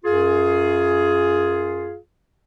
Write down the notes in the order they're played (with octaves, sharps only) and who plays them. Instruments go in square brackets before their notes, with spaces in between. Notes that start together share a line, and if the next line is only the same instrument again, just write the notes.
[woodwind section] F#2 F4 G#4